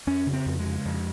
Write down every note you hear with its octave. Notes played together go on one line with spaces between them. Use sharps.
F2 C#4
C#3
C4
F2
G#3
C#3
F2